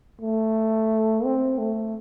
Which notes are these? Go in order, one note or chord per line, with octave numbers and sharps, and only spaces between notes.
A3
C4
A3